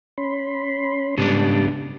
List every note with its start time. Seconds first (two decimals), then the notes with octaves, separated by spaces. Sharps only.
0.18 C#4 B5 C6
1.18 G#2 C#3 G3 B3 D4 A5